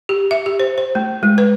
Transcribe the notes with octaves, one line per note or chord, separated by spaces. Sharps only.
G4
E5
G4
C5
C5
A3
G#3
B4